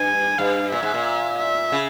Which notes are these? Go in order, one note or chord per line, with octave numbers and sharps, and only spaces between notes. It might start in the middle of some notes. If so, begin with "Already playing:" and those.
Already playing: G2 G#5
G2 F5
A#2 E5
G#2
A#2
E5
C#3